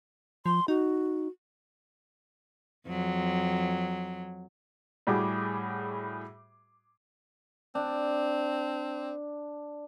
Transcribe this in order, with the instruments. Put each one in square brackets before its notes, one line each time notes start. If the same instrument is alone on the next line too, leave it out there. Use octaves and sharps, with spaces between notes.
[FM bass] F3 [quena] C6
[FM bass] D#4 [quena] F#4
[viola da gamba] F2 F#3
[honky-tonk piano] A2 G3 F#4 G#4 D6
[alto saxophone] C4 [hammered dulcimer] D4